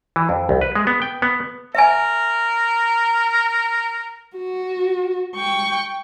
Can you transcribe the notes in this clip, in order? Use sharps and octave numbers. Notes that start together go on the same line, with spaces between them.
E3
F2
C2
B4
G#3
B3
G5
B3
A#4 E5 G#5
F#4
G5 C#6